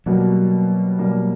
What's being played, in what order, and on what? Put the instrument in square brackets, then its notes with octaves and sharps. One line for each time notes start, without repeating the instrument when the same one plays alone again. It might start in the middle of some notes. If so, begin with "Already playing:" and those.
[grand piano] B2 G3 A#3 [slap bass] F#3
[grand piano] B2 G3 A#3